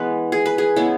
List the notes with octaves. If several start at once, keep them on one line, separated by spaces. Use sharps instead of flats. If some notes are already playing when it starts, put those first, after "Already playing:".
Already playing: E3 G#3 B3 B4
G#4
B4
G#4
C#3 G#3 B3 E4